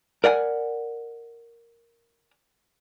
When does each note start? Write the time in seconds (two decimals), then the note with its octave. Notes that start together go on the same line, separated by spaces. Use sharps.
0.24 A#4 D5 F#5 G#5